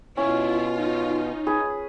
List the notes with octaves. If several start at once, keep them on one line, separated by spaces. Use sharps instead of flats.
B2 C#4 E4 F4
D#4
G#4 B4